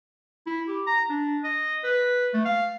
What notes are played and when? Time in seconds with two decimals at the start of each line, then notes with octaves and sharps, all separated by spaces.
0.46 E4
0.68 G4
0.87 A#5
1.09 D4
1.44 D#5
1.84 B4
2.34 A3
2.45 F5